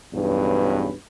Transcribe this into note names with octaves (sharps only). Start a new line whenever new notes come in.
B1 E2 G2 C#4 B4